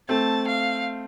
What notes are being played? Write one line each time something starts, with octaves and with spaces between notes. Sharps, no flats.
A3 C4 A5
F5